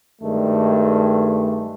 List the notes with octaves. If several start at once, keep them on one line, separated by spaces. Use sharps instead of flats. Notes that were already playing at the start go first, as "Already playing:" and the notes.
G2 D#3 G#3 A3